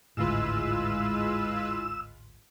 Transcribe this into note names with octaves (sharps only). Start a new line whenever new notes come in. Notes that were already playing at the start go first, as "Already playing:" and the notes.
G#1 D2 A2 G#3 E4 F4 B4 E6